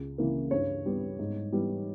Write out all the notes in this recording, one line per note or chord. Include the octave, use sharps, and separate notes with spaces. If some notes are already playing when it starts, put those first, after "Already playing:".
Already playing: C#2
C#3 E3 A#3
G2 C#5
G3 B3
G#2
E3 G3 B3